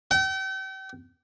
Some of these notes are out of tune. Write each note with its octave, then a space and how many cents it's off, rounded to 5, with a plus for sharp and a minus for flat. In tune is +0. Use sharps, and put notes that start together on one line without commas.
G5 -40